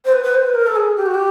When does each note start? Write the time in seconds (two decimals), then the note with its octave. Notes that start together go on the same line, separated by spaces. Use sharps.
0.04 C5
0.12 B4
0.23 B4
0.33 C5
0.44 B4
0.54 A#4
0.66 A4
0.75 G#4
0.96 G4
1.05 F#4
1.14 G4